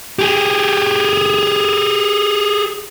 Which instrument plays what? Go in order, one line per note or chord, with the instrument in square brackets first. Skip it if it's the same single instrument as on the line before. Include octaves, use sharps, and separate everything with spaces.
[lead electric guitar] G4 G#4